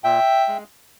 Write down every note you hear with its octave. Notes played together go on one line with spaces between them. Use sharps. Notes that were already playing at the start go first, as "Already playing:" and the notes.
A#2 E5 G5
G#3